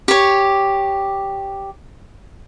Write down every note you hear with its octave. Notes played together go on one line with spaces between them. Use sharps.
G4 C#5